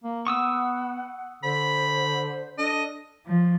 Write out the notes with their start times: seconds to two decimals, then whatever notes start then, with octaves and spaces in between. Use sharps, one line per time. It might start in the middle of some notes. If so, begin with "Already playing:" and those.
0.04 A#3
0.27 B3 F#5 C#6 D#6 E6
1.43 D3 C5 B5
2.58 D4 A4 D#5
3.25 F3